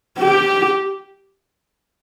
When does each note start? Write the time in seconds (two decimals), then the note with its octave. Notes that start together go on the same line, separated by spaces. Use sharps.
0.19 G4